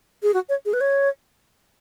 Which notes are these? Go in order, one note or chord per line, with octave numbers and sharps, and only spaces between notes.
G#4
F#4
C#5
G#4
B4
C#5